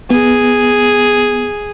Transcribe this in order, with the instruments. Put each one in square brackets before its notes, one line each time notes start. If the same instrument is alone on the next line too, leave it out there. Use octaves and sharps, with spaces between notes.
[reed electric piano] B3 [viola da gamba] G#4